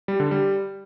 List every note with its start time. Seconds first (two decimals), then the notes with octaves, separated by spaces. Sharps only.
0.08 G3
0.20 D3
0.31 G3